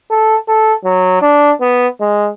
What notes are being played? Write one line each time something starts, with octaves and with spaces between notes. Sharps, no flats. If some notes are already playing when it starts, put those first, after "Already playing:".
A4
A4
F#3
D4
B3
G#3